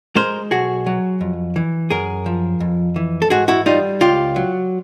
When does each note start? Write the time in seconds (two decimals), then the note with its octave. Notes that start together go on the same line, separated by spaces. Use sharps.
0.16 G#3 A#4 C5
0.51 B1 F#4 G#4
0.86 F#3
1.21 F2
1.56 E3
1.90 F#2 G#4 A#4
2.26 F3
2.60 F2
2.96 E3
3.22 A4
3.30 G#2 F#4 G#4
3.48 E4 F#4
3.66 G3 D#4 F4
4.01 C#2 F4 G4
4.36 F#3